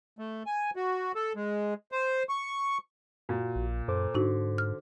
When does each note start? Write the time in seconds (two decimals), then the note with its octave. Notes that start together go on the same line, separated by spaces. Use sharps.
0.19 A3
0.46 G#5
0.76 F#4
1.15 A4
1.35 G#3
1.92 C5
2.29 C#6
3.29 A#2 F#4
3.56 A#1
3.88 F#2 A4 C5 D6
4.15 G#2 D3 D#4 F#4
4.58 F6